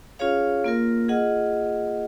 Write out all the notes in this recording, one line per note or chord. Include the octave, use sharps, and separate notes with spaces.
C#4 F4 G#4 C#5 F5
A#3 F4 A#4
F4 G#4 D#5 F#5